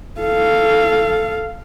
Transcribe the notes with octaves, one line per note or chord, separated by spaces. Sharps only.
A4 F5